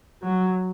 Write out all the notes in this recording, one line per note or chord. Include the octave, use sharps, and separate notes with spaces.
F#3